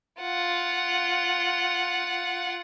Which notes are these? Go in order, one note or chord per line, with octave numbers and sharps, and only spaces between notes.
F4 F#5